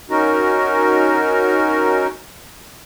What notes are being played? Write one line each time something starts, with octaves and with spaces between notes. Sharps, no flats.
C#4 D#4 F#4 A#4